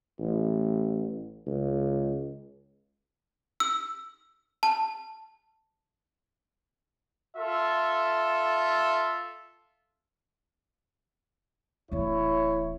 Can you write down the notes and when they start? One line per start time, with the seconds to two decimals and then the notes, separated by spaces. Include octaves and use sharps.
0.19 A1
1.47 C#2
3.60 E6
4.63 A5
7.37 F4 A4 E5
11.92 D1 E3 E4 C#5